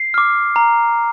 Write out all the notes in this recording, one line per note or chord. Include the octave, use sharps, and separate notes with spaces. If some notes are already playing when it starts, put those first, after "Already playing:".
Already playing: C7
D6 F6
A#5